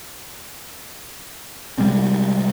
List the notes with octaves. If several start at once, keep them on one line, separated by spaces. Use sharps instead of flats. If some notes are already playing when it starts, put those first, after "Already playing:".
C3 G3 G#3 C4